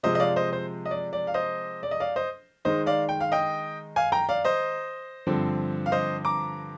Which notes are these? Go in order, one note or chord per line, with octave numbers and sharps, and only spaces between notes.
C3 F3 G#3 C5 D#5
D#5
D5 F5
C5 D#5
C5
D#5
D5
D5
F5
C5 D#5
D5
D#5
D5 F5
C5 D#5
D#3 G#3 D#4 C5 D#5
D5 F5
G5
F5
D#5 G5
F5 G#5
G5 A#5
D5 F5
C5 D#5
G2 D3 F3 C4
F5
C5 D#5
A#5 D6